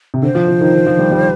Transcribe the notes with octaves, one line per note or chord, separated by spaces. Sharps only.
C3
D3 C5
F3
F3
D#3
D#3
F3
G3
G3